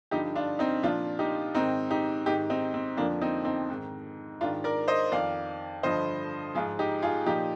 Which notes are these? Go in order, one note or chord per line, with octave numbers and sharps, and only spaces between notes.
G2 D3 F3 D#4 G4
D4 F4
C4 D#4
A#2 F3 D4 F4
D#4 G4
G#2 D#3 C4 D#4
D#4 G4
G#2 D#3 D#4 G4
C4 D#4
C4
F2 D3 F3 A#3 D4
C4 D#4
C4 D#4
G#2 D#3
G#2 D#3 D4 F4
A#4 D5
C5 D#5
F2 D#3 D5 F5
G2 D3 F3 C5 D#5
G#2 F3 F4 G#4
D#4 G4
F4 G#4
A#2 F3 D#4 G4